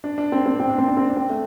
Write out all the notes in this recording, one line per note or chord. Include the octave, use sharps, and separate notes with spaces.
D4
D4
C4
C4
C4
D4
C4
D4
C4
D4
C4
A3